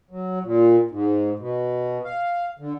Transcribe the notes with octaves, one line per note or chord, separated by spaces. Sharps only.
F#3
A#2
G#2
B2
F5
D3